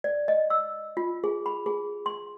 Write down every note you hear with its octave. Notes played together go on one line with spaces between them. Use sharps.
D5
D#5
E6
F4
G#4
B5
G#4
C6